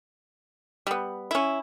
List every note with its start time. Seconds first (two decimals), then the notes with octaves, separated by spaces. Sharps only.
0.87 G3 B3
1.31 C#4 E4